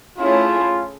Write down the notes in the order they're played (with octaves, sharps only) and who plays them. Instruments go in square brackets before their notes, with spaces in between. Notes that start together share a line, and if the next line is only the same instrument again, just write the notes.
[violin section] A3 C#4 E4 G#4 [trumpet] F4